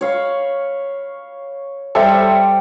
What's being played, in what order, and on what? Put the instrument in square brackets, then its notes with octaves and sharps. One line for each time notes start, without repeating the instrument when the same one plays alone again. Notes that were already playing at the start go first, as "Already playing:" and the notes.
[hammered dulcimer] C#5 F5 B5
[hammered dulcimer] G3 [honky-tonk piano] A4 C5 E5